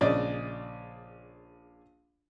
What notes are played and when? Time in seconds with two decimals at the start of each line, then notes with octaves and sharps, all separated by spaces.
0.01 A#1 C#3 D5 D#5